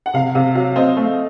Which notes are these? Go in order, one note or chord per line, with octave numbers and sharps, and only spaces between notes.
F#5
C3 F5
C3 F5
F#3 F5
C4 D#5
A3